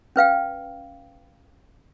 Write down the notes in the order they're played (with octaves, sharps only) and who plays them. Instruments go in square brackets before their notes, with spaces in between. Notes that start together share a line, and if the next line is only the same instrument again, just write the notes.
[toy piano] C#4 B4 F5 G5